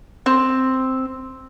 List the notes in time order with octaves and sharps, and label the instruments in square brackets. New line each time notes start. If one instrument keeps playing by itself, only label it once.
[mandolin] C4